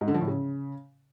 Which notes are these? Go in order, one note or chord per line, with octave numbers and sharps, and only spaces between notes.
G#2
D3
F3
A2
C#3